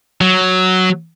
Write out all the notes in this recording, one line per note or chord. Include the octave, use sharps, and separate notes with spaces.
F#3